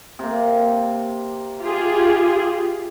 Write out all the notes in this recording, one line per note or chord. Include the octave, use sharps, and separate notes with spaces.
C3 A#3
F4 G4 G#4